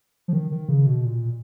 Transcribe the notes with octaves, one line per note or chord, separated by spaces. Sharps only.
F3
D#3
D#3
C#3
B2
A#2